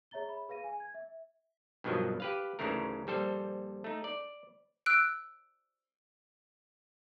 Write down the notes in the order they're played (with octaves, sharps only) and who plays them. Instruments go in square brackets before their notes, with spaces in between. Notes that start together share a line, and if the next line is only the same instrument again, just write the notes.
[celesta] G#4 C#5 E5 A#5 A6 G7
B5
G#4 B4 F5 A#6 D#7
G#5
G#6
E5
[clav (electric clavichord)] G2 B2 D#3 F3 F#3
G4 B4 F5
D2 G#2 C#3 E3 A3 A#4
A#1 G3 A4 C5
A3 D#4
D5
[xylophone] E6 F#6 D7